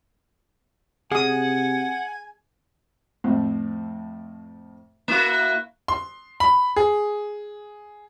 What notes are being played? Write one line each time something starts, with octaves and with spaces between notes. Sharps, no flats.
C3 G#4 F#5 G#5 D#6
F2 A2 C4
A#3 E4 F#4
C6
B5
G#4